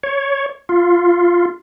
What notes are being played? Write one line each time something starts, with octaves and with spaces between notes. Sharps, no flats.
C#5
F4